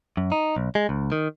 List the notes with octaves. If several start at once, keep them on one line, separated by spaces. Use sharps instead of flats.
F#2
D#4
B1
G#3
C#2
D#3